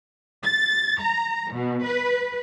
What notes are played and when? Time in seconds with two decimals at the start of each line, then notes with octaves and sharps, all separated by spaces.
0.44 A6
1.00 A#5
1.52 B2
1.84 B4